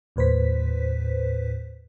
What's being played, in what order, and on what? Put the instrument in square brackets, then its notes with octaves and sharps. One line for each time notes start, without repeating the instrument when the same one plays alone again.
[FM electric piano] D#2 A2 B4 C5 B6